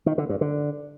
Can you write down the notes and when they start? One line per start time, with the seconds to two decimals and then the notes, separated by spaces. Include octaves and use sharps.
0.06 D#3
0.18 D3
0.29 G2
0.41 D3